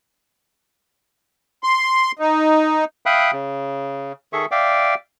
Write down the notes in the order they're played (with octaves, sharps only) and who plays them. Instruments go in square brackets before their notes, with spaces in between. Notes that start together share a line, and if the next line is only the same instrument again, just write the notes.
[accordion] C6
D#4
[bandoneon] E5 F5 G5 B5 D#6 F#6
C#3
D#3 G#4 A4 E5 C#6
D5 E5 F5 G5 D6